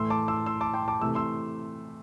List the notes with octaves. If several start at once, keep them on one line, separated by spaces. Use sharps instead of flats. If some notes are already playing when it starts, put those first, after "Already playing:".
Already playing: A2 E3 A3 C6 E6
A5 D6
C6 E6
C6 E6
A5 D6
G5 C6
A5 D6
C3 E3 A3 E6
C6 E6